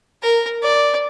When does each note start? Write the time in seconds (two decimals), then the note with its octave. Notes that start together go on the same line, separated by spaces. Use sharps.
0.22 A#4
0.63 D5